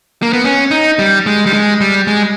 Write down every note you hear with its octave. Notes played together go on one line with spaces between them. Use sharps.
A#3
B3
C#4
D#4
G3
G#3
G3
G#3
G3
G#3